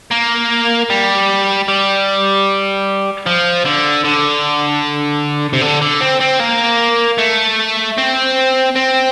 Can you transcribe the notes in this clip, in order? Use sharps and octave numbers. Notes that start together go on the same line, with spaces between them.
A#3
G3
G3
F3
D3
D3
C3
D3
D3
C4
C4
A#3
A3
C4
C4